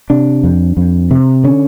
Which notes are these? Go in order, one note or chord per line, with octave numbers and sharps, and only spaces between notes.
C3 D4
F2
F2
C3
D3 C#4